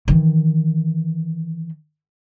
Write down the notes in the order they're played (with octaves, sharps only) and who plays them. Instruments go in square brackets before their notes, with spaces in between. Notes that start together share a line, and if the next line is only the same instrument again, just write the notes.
[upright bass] D#3 E3